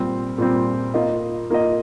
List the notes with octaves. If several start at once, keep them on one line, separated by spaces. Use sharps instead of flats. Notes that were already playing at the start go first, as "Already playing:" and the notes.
Already playing: A#2 G3 C4
A#2 G3 C4
A#3 F4 D#5
A#3 F4 D#5